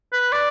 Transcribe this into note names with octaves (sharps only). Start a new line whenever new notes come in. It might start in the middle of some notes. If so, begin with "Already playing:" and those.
B4
D5